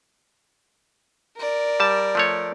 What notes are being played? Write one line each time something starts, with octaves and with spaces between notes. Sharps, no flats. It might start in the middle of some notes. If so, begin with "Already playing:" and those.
A#4 D5
G3 A5
F3 A3 C#5